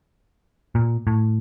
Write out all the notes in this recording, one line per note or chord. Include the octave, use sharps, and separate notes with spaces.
A#2
A2